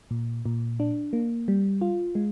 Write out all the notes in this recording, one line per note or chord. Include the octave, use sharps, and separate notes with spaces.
A#2
A#2
D4
A#3
G3
F4
G#3